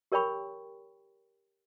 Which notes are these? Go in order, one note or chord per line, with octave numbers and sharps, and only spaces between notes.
G4 A#4 C#5 G5 B5 C#6